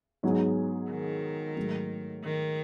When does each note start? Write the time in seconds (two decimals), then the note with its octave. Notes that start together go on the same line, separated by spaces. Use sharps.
0.23 G#2 F#3 B3 D#4 G#4
0.90 D#3
1.56 G#2 F#3 A3
2.24 D#3